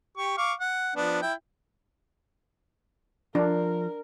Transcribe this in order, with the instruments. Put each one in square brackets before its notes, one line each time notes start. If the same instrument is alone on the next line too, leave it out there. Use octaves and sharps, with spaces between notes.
[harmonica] G4 C#6
F5 C#6 D6
F#5
F3 B3 D4
E4 G5
[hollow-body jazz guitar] F3 [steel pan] D4 [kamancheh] A#4